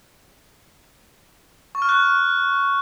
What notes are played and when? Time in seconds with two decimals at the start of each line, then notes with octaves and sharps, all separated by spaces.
1.75 C#6
1.82 F6
1.89 F#6